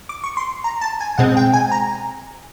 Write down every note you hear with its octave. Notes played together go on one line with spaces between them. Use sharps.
D6
C#6
C6
A#5
A5
G#5
B2 G#3 C4 F#5
G5
G#5
A#5